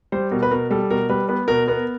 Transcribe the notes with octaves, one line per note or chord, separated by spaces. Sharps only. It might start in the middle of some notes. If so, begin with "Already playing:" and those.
G3 C5
B2 A#4
B4
B2 A#4
G3 A4
B2 A#4
G3 B4
B3 B4
B2 A#4
B3 A#4